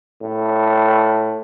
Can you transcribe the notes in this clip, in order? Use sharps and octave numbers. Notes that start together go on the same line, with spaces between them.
A2